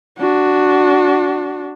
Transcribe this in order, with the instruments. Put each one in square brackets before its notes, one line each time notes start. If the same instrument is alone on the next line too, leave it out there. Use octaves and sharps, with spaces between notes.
[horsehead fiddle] D4 F#4